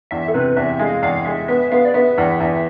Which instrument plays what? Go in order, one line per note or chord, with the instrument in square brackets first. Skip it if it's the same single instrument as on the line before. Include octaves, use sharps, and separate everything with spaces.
[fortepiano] E2 [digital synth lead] E5
[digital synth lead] A4
[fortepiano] C3 [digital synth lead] B4
[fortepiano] E2 [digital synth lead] E5
[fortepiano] G#3 [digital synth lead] F5
[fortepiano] E2 [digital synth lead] F5
[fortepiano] G#3 [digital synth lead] E5
[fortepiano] B3 [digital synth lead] E5
[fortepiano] B3 [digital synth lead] F5
[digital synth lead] D5
[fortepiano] B3 [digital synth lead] E5
[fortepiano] E2
E2